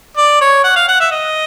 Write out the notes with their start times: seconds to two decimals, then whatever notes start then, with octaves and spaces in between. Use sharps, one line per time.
0.17 D5
0.41 C#5
0.64 F#5
0.76 F5
0.88 F#5
1.00 E5
1.11 D#5